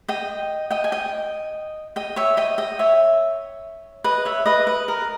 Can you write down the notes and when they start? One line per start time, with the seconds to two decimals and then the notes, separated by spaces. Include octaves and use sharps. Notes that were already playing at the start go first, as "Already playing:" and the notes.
0.08 D#5 G5
0.71 D#5 G5
0.84 G#5
0.92 D#5 G5
1.96 D#5 G5
2.16 C#5 E5
2.37 D#5 G5
2.58 D#5 G5
2.79 C#5 E5
4.04 B4 D#5
4.25 C#5 E5
4.46 B4 D#5
4.67 B4
4.88 A#4